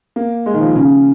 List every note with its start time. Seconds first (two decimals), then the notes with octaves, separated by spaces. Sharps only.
0.16 A#3
0.46 G#3
0.54 D#3
0.61 F3
0.75 C#3